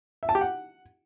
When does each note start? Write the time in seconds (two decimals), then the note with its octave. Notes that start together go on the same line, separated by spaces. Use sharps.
0.23 E5
0.29 A5
0.35 G4
0.41 F#5